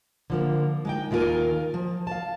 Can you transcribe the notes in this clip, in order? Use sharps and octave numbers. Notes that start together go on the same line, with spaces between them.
D3 F3 A#3
G#3 D#4 G5
D#2 D#3 E4 F4 A#4 G#5
F3
F5 A5